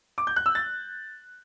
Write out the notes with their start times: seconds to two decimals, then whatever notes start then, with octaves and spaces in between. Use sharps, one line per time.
0.18 D6
0.27 G6
0.36 F#6
0.46 E6
0.55 A6